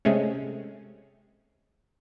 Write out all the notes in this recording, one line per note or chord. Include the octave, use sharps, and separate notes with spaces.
C3 G#3 A3 C#4